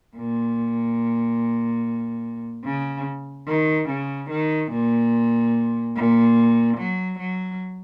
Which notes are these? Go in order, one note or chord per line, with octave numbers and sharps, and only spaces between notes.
A#2
C#3
D#3
C#3
D#3
A#2
A#2
F#3
F#3